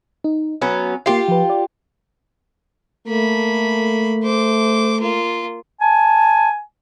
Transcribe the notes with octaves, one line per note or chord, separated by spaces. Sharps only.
D#4
F#3 B3 C#4 G#5
A#3 F4 G4 C7
F3 B4
D5
A3 A#3 B5
C5 D6
A#3 F4
G#5 A5